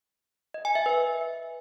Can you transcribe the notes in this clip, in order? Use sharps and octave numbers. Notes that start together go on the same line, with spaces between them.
D#5
G#5
E5
B4